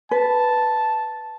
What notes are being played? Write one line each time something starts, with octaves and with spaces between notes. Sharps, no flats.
B4 A5